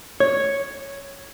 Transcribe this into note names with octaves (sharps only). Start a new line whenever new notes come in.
C#5